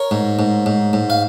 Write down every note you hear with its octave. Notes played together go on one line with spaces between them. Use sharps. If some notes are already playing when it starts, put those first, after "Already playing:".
Already playing: A#4 C#5
G#2
G#2
G#2
G#2
F5